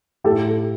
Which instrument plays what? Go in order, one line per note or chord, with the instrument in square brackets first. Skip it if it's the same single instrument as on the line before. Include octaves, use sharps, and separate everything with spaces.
[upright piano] A2 G4 A4